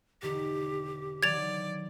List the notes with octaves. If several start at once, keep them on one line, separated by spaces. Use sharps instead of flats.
E1 D3 D#4 G4
D#3 E3 F#3 D5 G#6 A6 F7